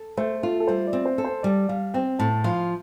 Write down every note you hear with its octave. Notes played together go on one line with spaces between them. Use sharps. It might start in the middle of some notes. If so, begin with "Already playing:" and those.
Already playing: A4
A3 C5
F4 A4
A4
G3 C5
D5
C4
C5
A4
C5
G3 D5
G3 F5
C4 G5
A2 A5
F3 F5